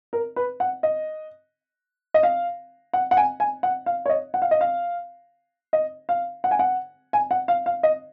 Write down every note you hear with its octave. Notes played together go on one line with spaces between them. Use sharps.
A#4
B4
F#5
D#5
D#5
F5
F#5
F#5
G#5
G#5
F#5
F5
C#5
D#5
F#5
F5
D#5
F5
D#5
F5
F#5
G#5
F#5
G#5
F#5
F5
F5
D#5